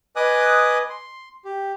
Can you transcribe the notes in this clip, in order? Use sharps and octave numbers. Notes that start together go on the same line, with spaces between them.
B4 D#5 G#5 D6 D#6 F#6
C6
G4